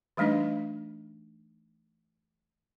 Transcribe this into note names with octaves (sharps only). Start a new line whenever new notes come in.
E3 G3 A3 D4 D#4 D#5